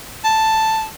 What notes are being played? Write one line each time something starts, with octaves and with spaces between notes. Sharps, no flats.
A5